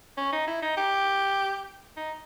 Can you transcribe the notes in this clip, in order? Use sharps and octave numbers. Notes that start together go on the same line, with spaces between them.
C#4
D#4
E4
D#4
G4
D#4